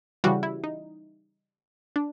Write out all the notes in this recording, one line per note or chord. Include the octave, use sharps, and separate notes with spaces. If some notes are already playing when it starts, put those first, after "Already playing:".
C#3 E3 G3 F#4
E4
D#4
D4